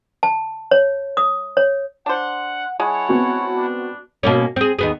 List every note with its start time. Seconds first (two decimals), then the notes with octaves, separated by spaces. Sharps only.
0.23 A5
0.71 C#5
1.17 D#6
1.57 C#5
2.06 D4 C5 F#5
2.80 G#3 E4 C#5 F#5 A5
3.09 B3 C4 F#4
3.56 D4
4.23 B2 A#3 C#4
4.56 C4 G#4
4.79 D#2 B3 G#4